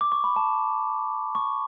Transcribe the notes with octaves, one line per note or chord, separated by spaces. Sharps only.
D6
C#6
B5
A5
C#6